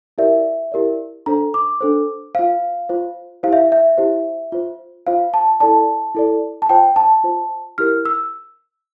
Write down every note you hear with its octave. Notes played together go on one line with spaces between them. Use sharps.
E4 G4 A#4 D5 E5
E4 G4 A#4 D5
D4 A4 C5 A#5
D6
D4 A4 C5
F4 C5 F5
F4 C5
E4 G4 C5 F5
E5
E5
E4 G4 C5
F4 C5
F4 C5 F5
A5
E4 A4 D5 A5
E4 A4 D5
A5
F4 C5 G5
A5
F4 C5
E4 G4 A#4 F6
E6